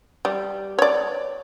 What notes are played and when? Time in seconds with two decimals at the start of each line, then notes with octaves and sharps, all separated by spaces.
0.25 G3
0.79 C#5 D5